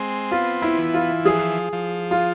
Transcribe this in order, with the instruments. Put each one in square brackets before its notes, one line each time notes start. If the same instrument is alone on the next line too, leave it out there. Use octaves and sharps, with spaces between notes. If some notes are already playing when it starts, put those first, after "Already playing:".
Already playing: [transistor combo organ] G#3 C4
[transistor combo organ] B3 [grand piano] F4
[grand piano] E4
[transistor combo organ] E3
[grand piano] F4
[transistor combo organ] F3 [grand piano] G#4
[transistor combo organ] F3
[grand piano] F4